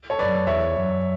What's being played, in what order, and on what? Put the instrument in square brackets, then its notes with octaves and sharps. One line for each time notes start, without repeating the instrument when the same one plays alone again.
[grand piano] A4 C#5
[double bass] F#2 [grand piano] B4 D5
[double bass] E2 [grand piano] C#5 E5
[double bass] F#2